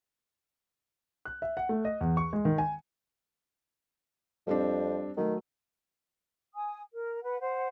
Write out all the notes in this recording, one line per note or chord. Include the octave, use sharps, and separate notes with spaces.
F#6
E5
F#5
A3
D#5
E2
C#6
G#3
D#3
G#5
F2 G3 C4 D4
D#3 F#3 A3
G#5 D#6
A#4
B4 F#5
C5 F#5